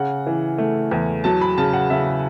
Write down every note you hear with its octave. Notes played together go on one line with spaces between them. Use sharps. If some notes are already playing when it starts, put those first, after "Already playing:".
Already playing: C#3 F#5
E3
A3
E2
F#3 A5
B5
C#3 A5
F#5
C#3 E5